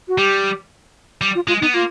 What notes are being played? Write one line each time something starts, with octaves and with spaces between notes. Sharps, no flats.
F#4
G3 G4
G3
F4
G#3 F4
B3 D#4
A#3 F4